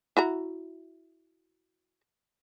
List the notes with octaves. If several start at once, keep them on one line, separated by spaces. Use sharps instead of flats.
E4 F#4 A#5